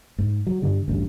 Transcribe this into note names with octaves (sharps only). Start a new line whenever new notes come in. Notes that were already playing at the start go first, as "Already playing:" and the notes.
G#2
F#3
G2 D3 G3
A1 D2 G2